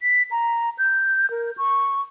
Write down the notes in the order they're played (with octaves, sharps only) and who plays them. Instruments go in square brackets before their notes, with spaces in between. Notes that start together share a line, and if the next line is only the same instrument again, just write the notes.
[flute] B6
A#5
G6
A#4
C#6